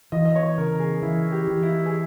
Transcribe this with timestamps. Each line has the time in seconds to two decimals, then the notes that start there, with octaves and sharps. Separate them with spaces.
0.12 E3 D#5
0.25 D#5
0.36 C#5
0.58 C#3 A#4
0.79 G#4
1.02 E3 E4
1.32 G4
1.47 E3
1.63 E4
1.86 G#4